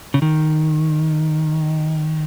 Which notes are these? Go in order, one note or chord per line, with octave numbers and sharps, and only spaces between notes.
C#3
D#3